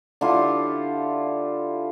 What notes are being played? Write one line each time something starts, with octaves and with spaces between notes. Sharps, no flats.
D3 E4 F4 G4